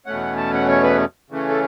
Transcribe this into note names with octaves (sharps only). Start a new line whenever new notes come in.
E2 B2 A3 C#4 F#5
A5
F#5
C#5
B4
C#3 E3 A3 C#4
A4